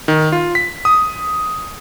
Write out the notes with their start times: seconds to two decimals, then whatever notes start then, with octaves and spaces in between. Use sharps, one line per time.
0.08 D#3
0.32 F4
0.55 B6
0.85 D#6